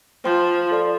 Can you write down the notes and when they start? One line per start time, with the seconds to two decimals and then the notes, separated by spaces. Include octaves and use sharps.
0.24 F3 C5 G5 C6 G6
0.71 A4 D5 F5 C6